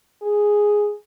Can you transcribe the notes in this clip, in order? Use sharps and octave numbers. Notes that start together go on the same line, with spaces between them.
G#4